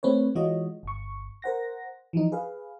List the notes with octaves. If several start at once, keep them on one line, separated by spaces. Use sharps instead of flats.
A3 C4 B4 C#5
E3 G#3 F4 F#4 C#5 D#5
G1 C#6
A#4 C5 F#5 A#6
E3 F3 D#4
G#4 B4 F5